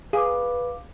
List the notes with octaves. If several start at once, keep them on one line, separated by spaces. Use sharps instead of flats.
G#4 B4 F5 D6